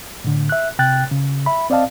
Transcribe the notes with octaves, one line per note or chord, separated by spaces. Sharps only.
A2 D3
E5 F#6
C3 G5 F#6 A6
C#3
E5 B5
C4 D5 D#5 F5 A5